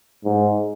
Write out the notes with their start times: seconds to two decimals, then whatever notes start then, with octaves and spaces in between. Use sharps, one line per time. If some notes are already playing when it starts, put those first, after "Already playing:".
0.25 G#2